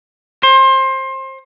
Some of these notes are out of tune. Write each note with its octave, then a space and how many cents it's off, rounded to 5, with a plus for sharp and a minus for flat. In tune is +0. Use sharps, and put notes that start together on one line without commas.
C5 +25